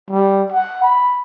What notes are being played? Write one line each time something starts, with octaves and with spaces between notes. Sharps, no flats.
G3
F#5
B5